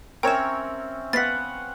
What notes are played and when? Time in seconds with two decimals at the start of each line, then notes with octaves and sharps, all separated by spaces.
0.23 C4 C#4 A#4 C#5 E5 G5 E7
1.13 B3 F5 F#5 A6 B6